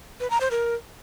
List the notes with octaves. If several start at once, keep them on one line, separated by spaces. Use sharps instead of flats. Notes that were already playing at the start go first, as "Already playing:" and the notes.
B4
A#5
C5
A#4